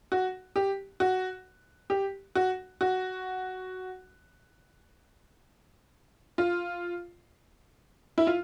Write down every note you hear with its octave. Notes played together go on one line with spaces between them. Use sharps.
F#4
G4
F#4
G4
F#4
F#4
F4
E4
F4